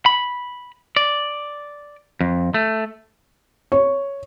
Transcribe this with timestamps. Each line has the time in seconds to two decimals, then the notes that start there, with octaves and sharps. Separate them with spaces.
0.06 B5
0.96 D5
2.21 F2
2.54 A3
3.72 C#5